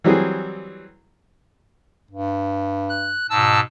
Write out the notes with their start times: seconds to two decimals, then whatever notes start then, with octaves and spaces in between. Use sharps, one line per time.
0.04 E3 F#3 G3 C4 G#4
2.11 G2
2.89 F#6
3.30 G#2 B2 A5 E6